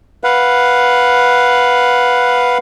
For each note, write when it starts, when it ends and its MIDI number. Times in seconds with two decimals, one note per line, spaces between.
0.24 2.58 71
0.24 2.58 77
0.24 2.58 78